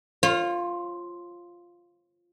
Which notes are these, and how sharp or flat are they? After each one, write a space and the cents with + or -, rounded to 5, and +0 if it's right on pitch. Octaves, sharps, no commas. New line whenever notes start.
F4 +0 C#5 -45